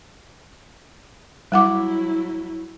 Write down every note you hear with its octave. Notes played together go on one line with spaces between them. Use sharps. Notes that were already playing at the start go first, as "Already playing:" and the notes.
F#3 G3 E4 F#5 D6